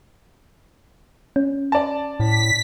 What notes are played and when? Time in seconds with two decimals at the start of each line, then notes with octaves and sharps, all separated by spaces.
1.36 C#4
1.72 D5 A5
2.20 A2 B6